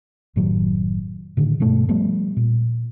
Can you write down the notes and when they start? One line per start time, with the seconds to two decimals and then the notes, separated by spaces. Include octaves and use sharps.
0.36 F#1 A2 D#3 F#3
1.37 A2 D3 D#3
1.60 G2 B2 G#3 A3
1.89 F3 G3 A3 B3
2.37 A#2